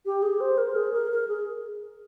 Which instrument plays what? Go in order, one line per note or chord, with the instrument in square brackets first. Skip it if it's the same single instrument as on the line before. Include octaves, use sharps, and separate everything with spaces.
[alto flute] G4
G#4
C5
A#4
G#4
A#4
A#4
G#4